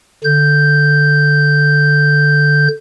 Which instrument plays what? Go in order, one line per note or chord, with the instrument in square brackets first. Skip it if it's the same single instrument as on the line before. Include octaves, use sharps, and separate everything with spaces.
[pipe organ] D3 G6